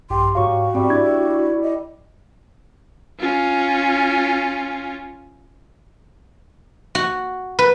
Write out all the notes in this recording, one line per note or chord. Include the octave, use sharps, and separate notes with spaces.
A#1 G2 G4 C6
G#2 F#4 A#4 C#5 F5 C#6 D#6
G#2 G3 C4 B4 E5
D4 E4 D5 D6 G#6
D#5
C#4 F4
F#4
B4